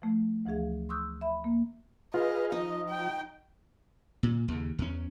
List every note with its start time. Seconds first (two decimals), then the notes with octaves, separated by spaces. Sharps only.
0.02 F3 A3
0.45 D2 E3 F3 G#4 F5
0.89 C6 C#6 D#6 E6 F#6 G6
1.21 E5 B5
1.44 A#3
2.14 F4 G#4 B4 D#5 F5
2.52 F3 D#4 D#5
2.89 G5
4.23 A#2
4.48 D#2 C#3
4.79 E2 C#4